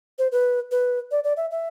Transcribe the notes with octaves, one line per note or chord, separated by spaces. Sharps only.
C5
B4
B4
D5
D5
E5
E5